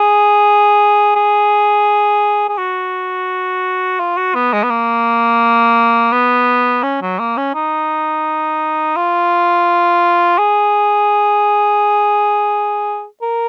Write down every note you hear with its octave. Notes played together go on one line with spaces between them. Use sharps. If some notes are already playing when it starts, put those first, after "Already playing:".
Already playing: G#4
G#4
G#4
F#4
F4
F#4
B3
G#3
B3
A#3
B3
C#4
F#3
A#3
C#4
D#4
F4
G#4
A#4